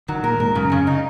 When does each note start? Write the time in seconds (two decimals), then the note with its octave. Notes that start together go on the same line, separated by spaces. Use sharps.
0.08 D#3 F#3
0.23 A#2 A#4
0.40 G#2 A#4
0.55 F#2 C#3
0.72 C#3
0.87 D#4